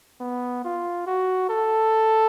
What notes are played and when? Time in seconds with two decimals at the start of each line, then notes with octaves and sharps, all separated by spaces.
0.21 B3
0.65 F4
1.07 F#4
1.49 A4